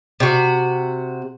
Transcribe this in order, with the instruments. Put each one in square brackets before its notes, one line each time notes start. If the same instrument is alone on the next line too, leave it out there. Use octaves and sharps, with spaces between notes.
[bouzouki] C3 F#4